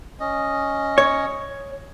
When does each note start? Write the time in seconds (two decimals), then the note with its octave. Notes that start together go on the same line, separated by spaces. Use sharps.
0.20 C#4 D#5
0.98 C#5